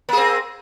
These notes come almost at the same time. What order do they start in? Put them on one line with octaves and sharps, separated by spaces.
A#3 G#4 C4